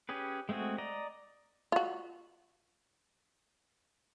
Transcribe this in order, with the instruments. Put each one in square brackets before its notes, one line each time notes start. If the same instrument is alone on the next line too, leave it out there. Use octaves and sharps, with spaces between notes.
[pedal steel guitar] C#4 G4 G#4 B4
G#3 A3 C4 F#4 G#4
D5 D#5 A#5
[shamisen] F4 F#4